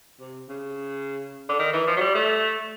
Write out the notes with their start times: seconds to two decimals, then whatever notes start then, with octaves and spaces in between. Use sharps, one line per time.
0.20 C3
0.48 C#3
1.49 D3
1.59 D#3
1.73 E3
1.87 F3
1.96 F#3
2.00 G3
2.15 A3